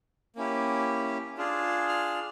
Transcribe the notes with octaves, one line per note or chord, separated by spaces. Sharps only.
A#3 C#4 E4 G4
D4 F4 G#4
F6